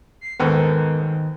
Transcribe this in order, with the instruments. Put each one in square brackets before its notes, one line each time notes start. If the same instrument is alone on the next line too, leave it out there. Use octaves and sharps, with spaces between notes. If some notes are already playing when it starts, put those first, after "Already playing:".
[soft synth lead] C7
[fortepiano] D#2 G#2 [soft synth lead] D#3 [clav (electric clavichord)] B3 A4 A#4